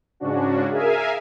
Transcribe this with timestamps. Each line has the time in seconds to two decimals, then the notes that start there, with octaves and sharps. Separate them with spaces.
0.20 G#2 C#3 C#4 D4 F#4
0.71 G#4 A#4 E5 F5 G#5